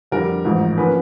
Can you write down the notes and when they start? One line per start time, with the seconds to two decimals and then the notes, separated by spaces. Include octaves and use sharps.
0.12 F2 D3 G3 A#4
0.45 A1 G#2 F3
0.78 D3 F3 A#3 C#4 B4